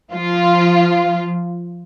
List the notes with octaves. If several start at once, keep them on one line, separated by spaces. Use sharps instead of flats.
F3 F4